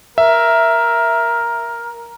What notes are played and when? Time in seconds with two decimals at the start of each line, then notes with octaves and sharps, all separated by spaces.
0.18 A#4 E5